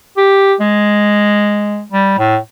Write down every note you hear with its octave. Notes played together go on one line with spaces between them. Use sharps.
G4
G#3
G3
A2